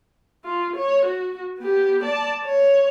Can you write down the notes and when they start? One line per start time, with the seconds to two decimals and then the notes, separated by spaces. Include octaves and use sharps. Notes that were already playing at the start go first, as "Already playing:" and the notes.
0.45 F4
0.76 C#5
1.06 F#4
1.59 B3 G4
2.04 D5 A5
2.45 C#5